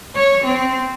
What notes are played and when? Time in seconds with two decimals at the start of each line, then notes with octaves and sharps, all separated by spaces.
0.15 C#5
0.45 C4